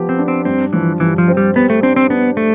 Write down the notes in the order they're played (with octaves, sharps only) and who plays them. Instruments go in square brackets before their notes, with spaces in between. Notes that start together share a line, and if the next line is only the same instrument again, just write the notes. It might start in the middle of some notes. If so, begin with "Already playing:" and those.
Already playing: [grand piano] F3 B3 G4
[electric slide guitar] C4
[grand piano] D4
[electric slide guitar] C4
[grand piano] G2 [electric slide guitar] C4
[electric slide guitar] E3 [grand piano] F3
[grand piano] G2 [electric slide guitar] E3
[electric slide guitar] F3
[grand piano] C4
[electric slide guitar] G3
[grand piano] G3 [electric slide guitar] B3
[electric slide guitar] A3
[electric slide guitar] C4 [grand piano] D4
[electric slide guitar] C4
[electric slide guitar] B3 [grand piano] D4
[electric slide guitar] A3